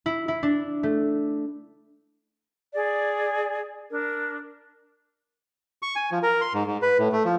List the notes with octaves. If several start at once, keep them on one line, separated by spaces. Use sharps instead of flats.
E4
E4
D4
A3
G#4 D5
D4 A#4
C#6
G#5
F3
A#4
C6
G#2
G#2
B4
A2
A3
F3